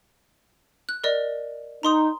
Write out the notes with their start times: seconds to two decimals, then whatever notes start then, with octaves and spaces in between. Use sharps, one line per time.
0.89 F#6
1.04 A#4 D5 D#5
1.83 D#4 A#5 C6 D#6